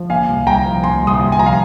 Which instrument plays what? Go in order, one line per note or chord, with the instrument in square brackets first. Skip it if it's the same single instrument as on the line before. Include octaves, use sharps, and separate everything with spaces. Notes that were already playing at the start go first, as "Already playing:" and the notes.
Already playing: [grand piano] F3
A#2 F5 G#5
C2
C2 G5 A#5
F3
A#2 G#5 C6
C2
C6 D#6
C2
G#5
F3 A#5
F5 G#5